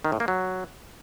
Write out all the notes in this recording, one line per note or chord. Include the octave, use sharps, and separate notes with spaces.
D#3
A2
A#3
F#3